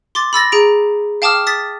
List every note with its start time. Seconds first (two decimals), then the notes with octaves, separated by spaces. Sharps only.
0.15 C6 D6 A6
0.33 B5 E6 A6 A#6
0.52 G#4 A#5 D7
1.22 F5 G5 A5 D6 D#6 F6
1.47 D#6 A6 B6